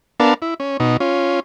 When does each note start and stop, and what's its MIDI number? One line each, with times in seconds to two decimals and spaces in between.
0.20 0.34 59
0.20 0.34 62
0.20 0.34 70
0.20 0.34 77
0.20 0.34 81
0.42 0.54 64
0.60 0.77 61
0.80 0.97 47
0.80 0.97 63
1.00 1.40 61
1.00 1.40 65